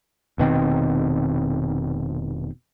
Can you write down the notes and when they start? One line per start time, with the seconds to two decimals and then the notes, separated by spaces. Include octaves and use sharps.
0.38 F1 B2 D#3 C4